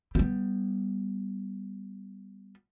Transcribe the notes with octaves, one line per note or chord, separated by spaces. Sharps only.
G3 B3